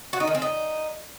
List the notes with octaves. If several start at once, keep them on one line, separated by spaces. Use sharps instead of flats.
F#4
D#4
D#3
C4
D#4